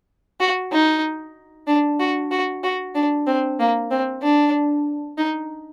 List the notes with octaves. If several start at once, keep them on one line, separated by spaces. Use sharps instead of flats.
F#4
D#4
D4
F#4
F#4
F#4
D4
C4
A#3
C4
D4
D#4